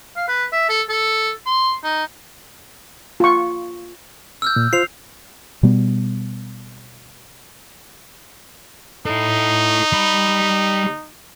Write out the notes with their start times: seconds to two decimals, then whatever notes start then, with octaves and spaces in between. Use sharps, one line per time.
0.16 F5
0.28 B4
0.52 E5
0.69 A4
0.89 A4
1.46 C6
1.84 D#4
3.20 F4 C#6
4.42 E6 F6 G6
4.56 A#2
4.73 F4 C5 C7 F7
5.63 B2 G3 B3
9.06 D#4 E4 A4
9.93 G3 B5